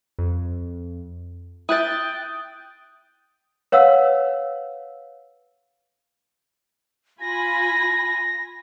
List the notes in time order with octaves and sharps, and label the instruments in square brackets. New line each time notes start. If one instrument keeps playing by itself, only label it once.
[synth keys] F2
[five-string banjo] E4 E5 [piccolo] G5 [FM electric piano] D#6 F#6 A6
[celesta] B4 C#5 F5 F#5 E6
[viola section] F4 G#5 B5 [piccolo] A#6